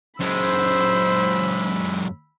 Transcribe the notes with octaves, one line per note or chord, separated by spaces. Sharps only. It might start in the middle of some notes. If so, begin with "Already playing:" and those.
F#2 G#3 C5 B5 E6